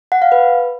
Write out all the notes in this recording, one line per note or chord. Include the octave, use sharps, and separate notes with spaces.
F#5
F5
B4